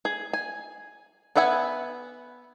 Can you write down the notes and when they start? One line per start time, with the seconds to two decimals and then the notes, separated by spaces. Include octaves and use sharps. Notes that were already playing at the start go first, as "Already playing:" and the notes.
0.05 G#4
0.33 G#5
1.36 B3 B4 E5 F#5 G#5